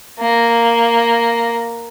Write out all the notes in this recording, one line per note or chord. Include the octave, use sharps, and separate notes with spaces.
A#3